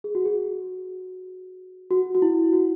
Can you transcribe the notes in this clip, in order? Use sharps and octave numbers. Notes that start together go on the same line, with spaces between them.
G#4
F#4
G#4
F#4
F#4
E4
F#4